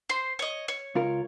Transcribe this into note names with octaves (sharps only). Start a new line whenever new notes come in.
C5 C6
C#5 D#5
C#5
C#2 F4 A#4